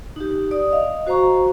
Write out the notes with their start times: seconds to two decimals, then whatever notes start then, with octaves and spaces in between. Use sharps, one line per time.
0.16 D#4 G4
0.51 D5 D#6
0.71 D#5 F5
1.07 F#4 C5 F5 A#5 C#6